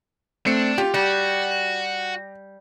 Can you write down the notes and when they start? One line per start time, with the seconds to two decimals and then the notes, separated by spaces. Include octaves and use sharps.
0.46 A3 C4 D4 C#7
0.78 F4 G4
0.94 G3 F#4